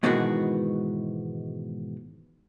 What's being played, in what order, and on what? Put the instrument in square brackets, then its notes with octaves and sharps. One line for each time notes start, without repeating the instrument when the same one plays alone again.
[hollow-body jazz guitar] G#2 B2 D#3 E3 G#3 F#4